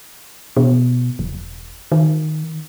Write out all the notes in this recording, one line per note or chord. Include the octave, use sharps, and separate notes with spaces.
B2
E1
D#3